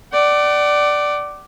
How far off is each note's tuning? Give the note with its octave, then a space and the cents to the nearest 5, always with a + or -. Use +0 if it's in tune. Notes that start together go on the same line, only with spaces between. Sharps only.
D5 +5 F#5 +45